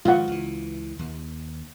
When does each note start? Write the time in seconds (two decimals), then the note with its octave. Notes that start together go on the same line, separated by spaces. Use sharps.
0.05 G#2 D#3 F3 F4 F#5
0.28 C#2 E3
0.99 D#2